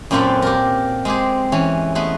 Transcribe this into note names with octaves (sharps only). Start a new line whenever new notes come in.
F#2 A#2 C4 F4 A4 B4
G4 A#4
G#3 C4 G4 G#4
E3 C#4
G#3 A3 B3 B4